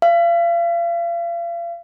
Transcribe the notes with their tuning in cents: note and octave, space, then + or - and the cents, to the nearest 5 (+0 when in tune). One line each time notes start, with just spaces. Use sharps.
F5 -40